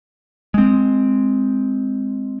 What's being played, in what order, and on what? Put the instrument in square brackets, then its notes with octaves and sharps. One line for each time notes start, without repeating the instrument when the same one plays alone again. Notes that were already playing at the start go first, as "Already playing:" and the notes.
[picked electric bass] G#3 C4